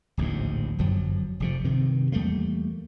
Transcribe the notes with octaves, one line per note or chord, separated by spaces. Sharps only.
D1 A#1 D#2 G#2
G1 F#2 F3 F#3
F1 C3 F3
G2 C3 D#3
E2 G3 A3 A#3